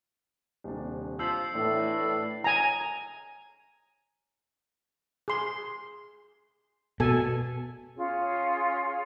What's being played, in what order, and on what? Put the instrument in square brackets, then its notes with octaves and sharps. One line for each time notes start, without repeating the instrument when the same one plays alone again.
[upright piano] D#1 C3 D4
[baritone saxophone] F3 [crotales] E6 C7 F#7 [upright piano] G6 B6
[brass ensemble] A2 [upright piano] E3 B3 [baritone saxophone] D4
[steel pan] G#5 A#5
G#4 C6
[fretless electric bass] B2 [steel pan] A4 G#5
[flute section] C#4 F4 G#4